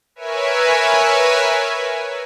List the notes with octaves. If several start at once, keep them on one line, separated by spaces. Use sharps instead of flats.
A#4 B4 C#5 E5 G#5